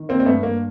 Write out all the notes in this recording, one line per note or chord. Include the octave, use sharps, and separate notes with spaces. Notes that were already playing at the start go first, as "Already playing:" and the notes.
Already playing: D#3
A#3 C4
C4
G2 A3 B3
A#3